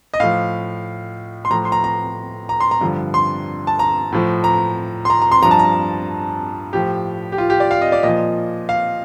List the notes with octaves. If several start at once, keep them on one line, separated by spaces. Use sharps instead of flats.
D#5
A2 F3 F5
C6
A2 F3 A#5
C6
A#5
A#5
A#5
C6
A#5
G2 D3 F3
C6
A5
A#5
A2 F3
A#5
C6
A#5
A#5
C6
G2 F3 A#5
A5
A#5
A2 F3 G4
G4
F4
G4
D5
F5
D#5
D5
A#2 F3 D#5
F5